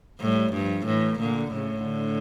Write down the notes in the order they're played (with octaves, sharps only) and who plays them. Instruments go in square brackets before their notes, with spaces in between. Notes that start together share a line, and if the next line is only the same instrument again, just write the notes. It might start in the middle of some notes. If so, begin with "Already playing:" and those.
[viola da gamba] A2 [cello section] G3
[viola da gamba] G2 [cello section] F3
[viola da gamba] A2 [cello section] E3
[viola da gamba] A#2 [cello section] D3
[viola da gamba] A2 [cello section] C#3
[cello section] D3